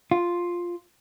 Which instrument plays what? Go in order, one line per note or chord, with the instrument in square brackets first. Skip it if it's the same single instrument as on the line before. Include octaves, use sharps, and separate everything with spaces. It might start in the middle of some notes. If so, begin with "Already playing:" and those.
[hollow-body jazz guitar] F4